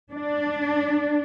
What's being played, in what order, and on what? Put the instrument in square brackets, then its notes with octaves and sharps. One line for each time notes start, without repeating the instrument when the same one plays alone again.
[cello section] D4